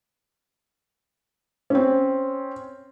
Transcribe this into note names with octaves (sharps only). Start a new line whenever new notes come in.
C4 C#4